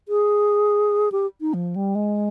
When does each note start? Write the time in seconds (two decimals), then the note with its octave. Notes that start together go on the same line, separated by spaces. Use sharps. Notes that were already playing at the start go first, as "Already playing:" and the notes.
0.08 G#4
1.12 G4
1.41 D#4
1.54 F3
1.76 G3
1.95 G#3